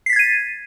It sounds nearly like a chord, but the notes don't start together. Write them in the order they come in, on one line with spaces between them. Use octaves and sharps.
C7 B6 A6 G#6 D#7